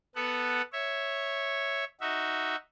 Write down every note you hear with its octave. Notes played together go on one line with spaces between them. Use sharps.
B3 A4 F#5
C#5 E5
D#4 F#4 E5